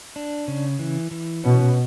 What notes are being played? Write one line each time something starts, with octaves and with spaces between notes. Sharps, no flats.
D4
C#3
E3
E3
B2 C#4